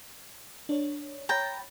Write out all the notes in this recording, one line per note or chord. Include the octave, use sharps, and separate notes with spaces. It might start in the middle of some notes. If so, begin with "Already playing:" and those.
D4 C#5
C#5 G5 A#5 B5 A6